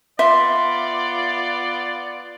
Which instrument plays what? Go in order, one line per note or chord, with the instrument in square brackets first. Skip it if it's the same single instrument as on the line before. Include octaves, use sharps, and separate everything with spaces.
[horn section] B3 F4 D5 [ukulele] E5 [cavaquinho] C6